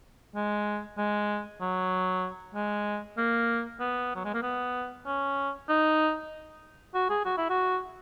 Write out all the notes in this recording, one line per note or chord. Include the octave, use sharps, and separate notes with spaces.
G#3
G#3
F#3
G#3
A#3
B3
F#3
G#3
A#3
B3
C#4
D#4
F#4
G#4
F#4
E4
F#4